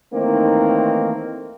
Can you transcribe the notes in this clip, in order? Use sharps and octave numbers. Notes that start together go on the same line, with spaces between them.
D#3 E3 A3 A#3 C4 D#4